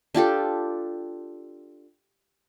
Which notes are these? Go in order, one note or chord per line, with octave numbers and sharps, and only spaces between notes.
D4 F4 G4 A4